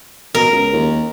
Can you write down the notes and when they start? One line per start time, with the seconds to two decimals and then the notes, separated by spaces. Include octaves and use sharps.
0.35 B2 A#4
0.51 C#2
0.73 D#2